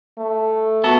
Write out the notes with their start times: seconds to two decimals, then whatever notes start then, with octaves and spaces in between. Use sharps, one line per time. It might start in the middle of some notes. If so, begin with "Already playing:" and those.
0.18 A3
0.84 B3 F#4 A4